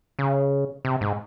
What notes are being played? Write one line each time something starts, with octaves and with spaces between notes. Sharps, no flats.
C#3
C3
G#2